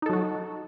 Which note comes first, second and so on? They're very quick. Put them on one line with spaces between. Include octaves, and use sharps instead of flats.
D#4 A4 F#3 F#4